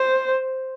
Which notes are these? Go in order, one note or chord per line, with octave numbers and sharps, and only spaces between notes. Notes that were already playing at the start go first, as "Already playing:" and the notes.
Already playing: C5